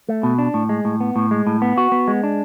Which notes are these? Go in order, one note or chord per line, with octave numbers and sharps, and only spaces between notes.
A3
B2
D4
A2
G#3
A2
B3
A2
G#3
A2
B3
F#4
B3
G#3
D4